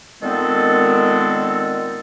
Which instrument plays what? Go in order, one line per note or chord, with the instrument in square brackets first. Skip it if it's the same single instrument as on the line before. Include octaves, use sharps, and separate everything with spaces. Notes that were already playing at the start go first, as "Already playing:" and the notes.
[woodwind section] A#2 D#3 G#3 B3 C4 A4